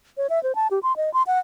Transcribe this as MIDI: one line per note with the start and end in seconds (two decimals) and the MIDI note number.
0.17 0.27 73
0.30 0.42 76
0.43 0.55 72
0.55 0.68 81
0.71 0.79 67
0.83 0.95 84
0.97 1.12 75
1.14 1.23 84
1.27 1.39 78